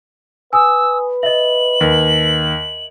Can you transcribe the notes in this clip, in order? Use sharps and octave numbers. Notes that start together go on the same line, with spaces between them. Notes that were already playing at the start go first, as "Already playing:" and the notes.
B4 G#5 D#6 E6
D#5 E5 F#7
D#2